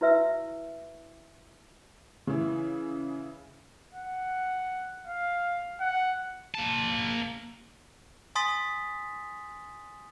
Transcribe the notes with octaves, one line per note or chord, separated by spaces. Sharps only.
E4 F#4 B4 E5 E6
C#3 E3
F#5
F5
F#5
A#3 A5
G#5 C6 D#6 A6 B6